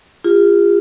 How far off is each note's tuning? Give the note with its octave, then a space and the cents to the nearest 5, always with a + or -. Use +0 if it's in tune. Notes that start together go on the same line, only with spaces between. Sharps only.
F4 -10 G#4 -45